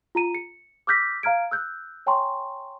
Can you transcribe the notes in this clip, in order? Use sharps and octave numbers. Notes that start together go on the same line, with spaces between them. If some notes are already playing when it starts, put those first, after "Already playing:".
F4 A#5 D#7
C#7
D6 E6 F6 G6 A#6 B6
F5 A#5 F6 G#6 D7
E6 F#6 G6
C#5 G5 G#5 A#5 C6 C#6